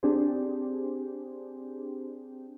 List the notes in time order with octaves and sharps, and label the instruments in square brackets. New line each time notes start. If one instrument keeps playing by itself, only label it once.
[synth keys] C4 D4 G4 G#4 C5